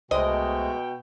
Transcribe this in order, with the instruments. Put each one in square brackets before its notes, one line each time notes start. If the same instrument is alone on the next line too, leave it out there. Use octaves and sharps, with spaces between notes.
[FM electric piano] C2 C5 [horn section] B2 G5 [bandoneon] G#3 A3 [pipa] D#5